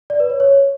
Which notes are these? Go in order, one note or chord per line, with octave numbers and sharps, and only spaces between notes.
D5
B4
C#5
C#5